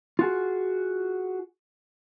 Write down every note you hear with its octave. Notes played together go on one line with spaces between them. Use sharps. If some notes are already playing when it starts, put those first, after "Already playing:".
F4 F#4 G#4